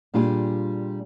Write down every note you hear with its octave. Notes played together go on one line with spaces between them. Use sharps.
A#2 G3 D4 F4 G4 G#4